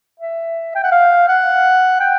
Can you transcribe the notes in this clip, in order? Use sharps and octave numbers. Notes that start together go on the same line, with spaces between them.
E5
G5
F#5
F5
F#5
G5